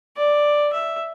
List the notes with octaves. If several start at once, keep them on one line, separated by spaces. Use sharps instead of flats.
D5
E5